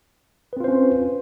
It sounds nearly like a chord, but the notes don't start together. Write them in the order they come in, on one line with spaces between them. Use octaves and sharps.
B4 C4 F4 C5 C#4